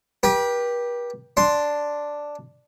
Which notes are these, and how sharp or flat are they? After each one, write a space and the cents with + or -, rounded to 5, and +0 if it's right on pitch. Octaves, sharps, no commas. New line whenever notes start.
G4 +0 B4 -45
D4 +0 C6 +0